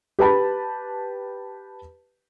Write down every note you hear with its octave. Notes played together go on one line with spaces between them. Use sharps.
G4 B4 A5 B5